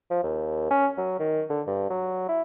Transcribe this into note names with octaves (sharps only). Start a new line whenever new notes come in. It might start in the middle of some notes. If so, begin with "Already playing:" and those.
F3
D#2
C#4
F#3
D#3
D3
G2
F#3
E4